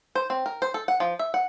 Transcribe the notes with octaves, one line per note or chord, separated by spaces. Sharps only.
C5
C4
A#4
C5
A4
F#5
F3
E5
F#5